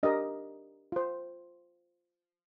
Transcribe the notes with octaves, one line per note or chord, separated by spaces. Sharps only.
D4 G4 A#4 D#5
F4 C5